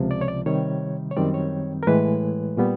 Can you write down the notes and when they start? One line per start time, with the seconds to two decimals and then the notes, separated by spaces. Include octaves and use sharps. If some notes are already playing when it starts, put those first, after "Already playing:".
Already playing: C#2 C3 F3
0.11 D5
0.21 C#5
0.28 D5
0.46 C3 D#3 G3 C#5
1.11 C#5
1.17 F#2 D#3 G3 C4 D5
1.34 C#5
1.83 A#4
1.87 A2 E3 G#3 B4
2.57 A#2 G3 B3